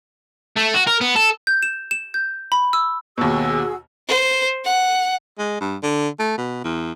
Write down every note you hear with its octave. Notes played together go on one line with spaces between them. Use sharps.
A3
F#4
A#4
B3
A4
G6
E7
E7
G6
B5
E6
D#2 B2 F#4 G#4 E6
C5
F#5
G#3
G2
D3
A3
B2
E2